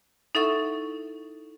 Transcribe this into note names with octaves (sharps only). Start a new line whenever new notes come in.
D#4 E4 A4 E5 F#5 C#6